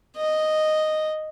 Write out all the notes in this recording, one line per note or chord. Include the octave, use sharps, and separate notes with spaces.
D#5